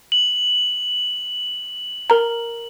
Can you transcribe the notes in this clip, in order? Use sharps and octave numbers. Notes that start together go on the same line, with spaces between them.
F#7
A#4 A#5